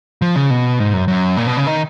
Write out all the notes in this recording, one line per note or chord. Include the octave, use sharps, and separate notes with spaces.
F3
C#3
B2
G#2
F#2
F#2
A#2
B2
C#3
D#3